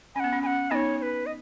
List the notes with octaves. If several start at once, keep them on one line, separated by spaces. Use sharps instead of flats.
C#4 G#5
B3 F#5
C#4
C#4 F#5 G#5
B3 D#4 C#5 D#5
C#5
B4
D#5